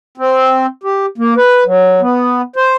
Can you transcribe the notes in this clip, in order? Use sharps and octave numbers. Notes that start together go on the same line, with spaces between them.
C4
G4
A#3
B4
F#3
B3
C5